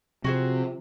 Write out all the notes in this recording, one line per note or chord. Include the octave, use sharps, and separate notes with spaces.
C3 F3 F#4 G#4 C5